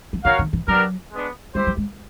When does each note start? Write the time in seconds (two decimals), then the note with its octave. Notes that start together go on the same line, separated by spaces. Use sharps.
0.13 F3
0.24 D#3 F#4 A#4 C#5 F5
0.39 D#3
0.53 E3
0.68 F#3 B3 D4 G4 A#4
1.12 G#3 B3 D4
1.55 G3 E4 G4 C5
1.67 F#3
1.77 G#3